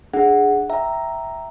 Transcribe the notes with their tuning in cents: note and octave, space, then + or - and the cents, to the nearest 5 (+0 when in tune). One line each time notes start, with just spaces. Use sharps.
D4 +25 G#4 +0 F#5 +0
E5 +0 G5 -15 A#5 +0